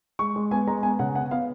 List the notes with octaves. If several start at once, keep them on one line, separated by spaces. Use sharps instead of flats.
G#3 C#6
G#3
B3 G#5
G#3 A#5
B3 G#5
C#3 F#5
B3 F#5
B3 F5